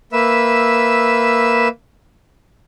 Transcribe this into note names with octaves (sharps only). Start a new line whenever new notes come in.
A#3 B4 E5 E6